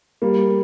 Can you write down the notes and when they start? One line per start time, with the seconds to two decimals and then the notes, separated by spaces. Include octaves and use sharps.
0.22 G3 A#3